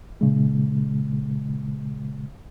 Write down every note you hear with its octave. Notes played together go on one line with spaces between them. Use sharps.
A#2 C#3 G#3